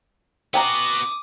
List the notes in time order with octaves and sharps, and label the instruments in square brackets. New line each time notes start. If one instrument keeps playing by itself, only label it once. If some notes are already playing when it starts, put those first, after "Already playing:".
[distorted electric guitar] B3 F#4 [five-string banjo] G5 G#5 A#5 [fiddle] D6 D#6